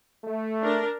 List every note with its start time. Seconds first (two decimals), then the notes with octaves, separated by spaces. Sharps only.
0.24 A3
0.62 D4 A#4